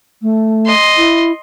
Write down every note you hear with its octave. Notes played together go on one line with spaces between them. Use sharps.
A3
D#5 C6
E4